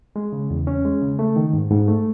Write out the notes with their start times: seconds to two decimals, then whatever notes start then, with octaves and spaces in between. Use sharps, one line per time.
0.16 G#3
0.33 C#3
0.50 E2
0.67 C#4
0.85 G#3
1.02 C#3
1.19 A3
1.36 D#3
1.53 G#2
1.70 G#2
1.88 A3